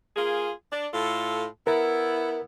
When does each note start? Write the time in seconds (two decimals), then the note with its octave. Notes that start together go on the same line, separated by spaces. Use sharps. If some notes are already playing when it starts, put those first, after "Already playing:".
0.16 A#3 F4 G#4
0.72 D4
0.94 A2 F4 A4
1.67 B3 E4 A#4